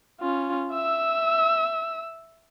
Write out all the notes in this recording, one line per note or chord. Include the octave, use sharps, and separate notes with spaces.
C#4 F4
E5 E6